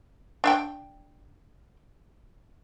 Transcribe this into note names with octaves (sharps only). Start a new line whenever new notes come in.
D4 E5 G5